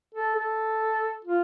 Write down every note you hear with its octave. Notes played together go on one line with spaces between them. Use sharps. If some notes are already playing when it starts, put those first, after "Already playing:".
A4
A4
F4